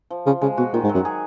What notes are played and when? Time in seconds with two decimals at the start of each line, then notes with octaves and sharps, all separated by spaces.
0.10 F3
0.26 C#3 F4
0.41 C#3 G#3
0.57 B2 F#4
0.73 A#2 D#3
0.84 G#2
0.89 F#3
0.95 F#2
1.05 G#4